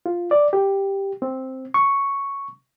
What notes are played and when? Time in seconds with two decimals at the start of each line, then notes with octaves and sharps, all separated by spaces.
0.06 F4
0.31 D5
0.53 G4
1.22 C4
1.74 C#6